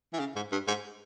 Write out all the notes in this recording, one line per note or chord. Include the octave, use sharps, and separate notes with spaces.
E3
C#3
G#2
G2
G#2